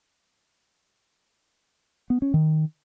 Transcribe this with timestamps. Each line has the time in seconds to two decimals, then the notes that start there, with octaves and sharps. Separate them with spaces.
2.10 B3
2.22 C#4
2.34 D#3